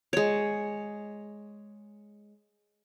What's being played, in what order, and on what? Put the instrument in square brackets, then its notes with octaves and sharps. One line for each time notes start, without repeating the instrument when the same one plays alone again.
[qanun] G#3 C#5